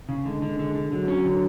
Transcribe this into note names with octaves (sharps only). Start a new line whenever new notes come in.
C#3
D3 G#3
D3
D3
D3
D3 F#3
C#4
D3